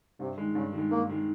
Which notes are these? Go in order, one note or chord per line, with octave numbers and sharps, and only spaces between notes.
G2 C3
D#3 G#3
G2 C#3
D#3
G#3
G2 A#3
D#3 G#3